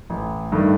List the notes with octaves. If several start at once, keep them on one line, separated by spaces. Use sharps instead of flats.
A1
G2 D#3 A3